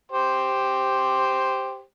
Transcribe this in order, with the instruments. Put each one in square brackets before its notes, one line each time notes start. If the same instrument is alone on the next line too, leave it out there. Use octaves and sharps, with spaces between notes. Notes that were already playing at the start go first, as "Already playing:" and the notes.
[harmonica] G4 C5